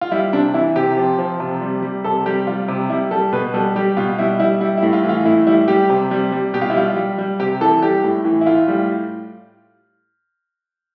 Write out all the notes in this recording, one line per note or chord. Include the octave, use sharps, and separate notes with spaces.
F4
G3 E4
C3 D4
E3 E4
C3 G4
F3
F3
C3
G3
G3
C3 A4
G3 G4
G3 F4
C3
G3 E4
G3 A4
B2 B4
G3 A4
G3 G4
B2 F4
G3 E4
G3 E4
G3 E4
E4
A2
F4
E3
F4
A2 E4
G3 E4
G3 G4
C3
G3
G3
B2 G4
F4
E4
G3 F4
G3
G3
C3 G4
E3 A4
G3 G4
A2
E3
E4
A2 F4
G3